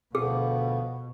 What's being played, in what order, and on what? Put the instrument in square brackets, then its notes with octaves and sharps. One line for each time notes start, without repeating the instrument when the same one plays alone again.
[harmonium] D2 F3 B3 [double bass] B2 [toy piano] G#4